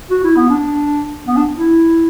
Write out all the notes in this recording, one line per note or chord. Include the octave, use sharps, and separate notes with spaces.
F#4
E4
B3
D4
B3
D4
E4